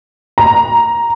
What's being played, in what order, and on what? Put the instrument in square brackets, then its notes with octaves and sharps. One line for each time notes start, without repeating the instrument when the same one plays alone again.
[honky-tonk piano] A#5